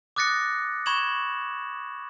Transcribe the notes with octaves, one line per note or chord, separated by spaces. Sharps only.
D6 D#6 F#6 A6 A#6 C#7
B5 C#6 G#6 E7 F#7